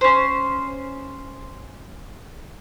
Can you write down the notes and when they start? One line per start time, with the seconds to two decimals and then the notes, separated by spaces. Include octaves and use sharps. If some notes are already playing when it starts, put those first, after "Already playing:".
0.01 C#4 C5